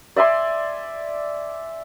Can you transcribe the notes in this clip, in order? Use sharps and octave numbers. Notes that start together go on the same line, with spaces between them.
D5 E5 G#5 C6